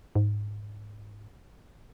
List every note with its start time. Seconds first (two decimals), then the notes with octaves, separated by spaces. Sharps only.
0.15 G#2